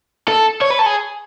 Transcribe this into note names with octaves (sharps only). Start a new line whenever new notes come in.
A4
C#5
B4
A4
G#4